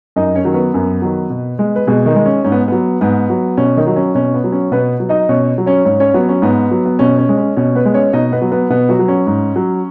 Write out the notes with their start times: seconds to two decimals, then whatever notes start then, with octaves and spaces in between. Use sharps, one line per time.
0.16 F#2 D#4 D#5
0.35 C#4 C#5
0.45 D#3 F#3
0.54 B3 B4
0.74 F#2
1.02 D#3 F#3
1.30 B2
1.59 G#3
1.76 B4
1.87 B2 G#3 G#4
2.06 D#3 D#4
2.15 G#3
2.26 C#4
2.44 G#2 C#4
2.52 B3
2.68 F#3 B3
3.01 G#2 B3
3.30 F#3
3.58 B2 C#4
3.77 D#3 D#4
3.87 F#3
3.96 C#4
4.15 B2 C#4
4.34 B3
4.44 F#3
4.52 C#4
4.72 B2 B3 B4
5.00 F#3
5.09 D#4 D#5
5.29 B2 C#4 C#5
5.58 F#3
5.66 C#4 C#5
5.85 G#2 C#4 C#5
6.00 C#4 C#5
6.14 F#3 B3
6.29 C#4
6.42 G#2 B3
6.71 F#3
6.86 B3
6.99 B2 C#4
7.18 C#4
7.29 G#3
7.37 C#4
7.57 B2 C#4
7.75 B3 B4
7.85 G#3
7.94 C#4 C#5
8.13 B2 D#4 D#5
8.32 B3 B4
8.42 F#3
8.51 B3 B4
8.70 B2 B3 B4
8.89 F#3 F#4
8.99 F#3
9.08 C#4
9.27 G#2
9.56 F#3